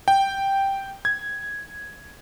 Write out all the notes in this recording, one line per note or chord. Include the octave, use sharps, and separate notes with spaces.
G5
G#6